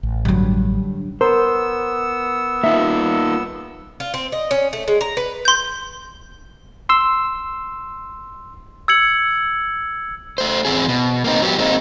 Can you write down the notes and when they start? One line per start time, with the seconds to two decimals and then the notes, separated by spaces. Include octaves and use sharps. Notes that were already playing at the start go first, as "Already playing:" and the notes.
0.03 A1
0.25 G2 D3 F#3
1.21 B3 A#4 C5 E6
2.64 A#3 D#4 F4 E5
4.00 F4
4.14 C4
4.32 D#5
4.51 C#4
4.73 A3
4.88 G#3
5.01 A#5
5.17 B4
5.45 C6 G6
6.89 C6 E6
8.88 E6 G#6 C#7 F#7
10.38 A3 C5
10.65 E2 C4 G#4
10.89 B2
11.24 A#3 C4 D#4
11.42 F#3 B3 G4
11.58 G#3 A#3 C4 D#4